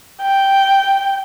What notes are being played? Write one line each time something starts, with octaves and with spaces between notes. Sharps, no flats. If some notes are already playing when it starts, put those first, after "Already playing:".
G5